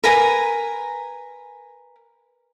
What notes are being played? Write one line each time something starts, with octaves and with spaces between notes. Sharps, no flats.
A#4 B4 G#5 A#5